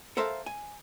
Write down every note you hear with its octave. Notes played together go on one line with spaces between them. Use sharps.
A4 A#4 C5 E5 F5 A5
G#5